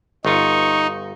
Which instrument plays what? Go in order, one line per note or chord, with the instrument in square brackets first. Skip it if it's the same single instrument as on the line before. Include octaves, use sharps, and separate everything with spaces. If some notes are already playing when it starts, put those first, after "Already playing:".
[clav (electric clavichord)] G1 F4 [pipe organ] D#4 [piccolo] C#6